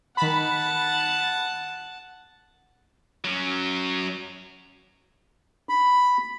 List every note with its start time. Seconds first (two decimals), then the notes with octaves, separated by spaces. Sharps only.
0.17 D#3 F#5 A5 B5
3.25 F#3 C#4
5.69 B5